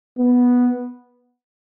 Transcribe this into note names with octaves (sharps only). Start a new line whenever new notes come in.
B3